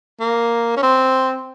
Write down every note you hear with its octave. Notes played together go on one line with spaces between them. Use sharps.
A#3
C#4
C4